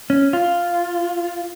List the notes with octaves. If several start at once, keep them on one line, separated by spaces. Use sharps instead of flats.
C#4
F4